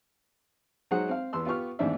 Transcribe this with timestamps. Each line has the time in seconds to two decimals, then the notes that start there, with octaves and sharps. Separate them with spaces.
0.91 F#3 G#3 D#4 G#4 C5 F#5
1.09 C4 F5
1.33 E2 B3 C6 E6
1.45 B3 F4 G4 C#6 F6
1.79 A1 D#2 G#2 C4 D4 E5